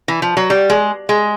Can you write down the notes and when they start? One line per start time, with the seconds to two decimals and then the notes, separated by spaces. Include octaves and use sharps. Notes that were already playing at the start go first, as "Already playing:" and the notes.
0.08 E3
0.22 F3
0.37 F#3
0.50 G3
0.70 G#3
1.09 G#3